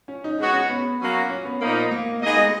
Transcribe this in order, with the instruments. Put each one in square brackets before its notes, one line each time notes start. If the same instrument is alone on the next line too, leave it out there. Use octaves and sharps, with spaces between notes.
[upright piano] C#4
D#4
[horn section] G#3 B3 F#4 C#5 [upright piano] C#4
[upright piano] C#4
B3
[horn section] F#3 A#3 C#4 F#4
[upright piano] C#4
B3
[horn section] A#2 F3 A#3 D#4
[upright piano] A#3
[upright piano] A#3 [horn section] B3 D#4 G#4 D#5
[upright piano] G#3